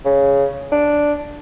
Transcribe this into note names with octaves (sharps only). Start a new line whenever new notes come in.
C#3
D4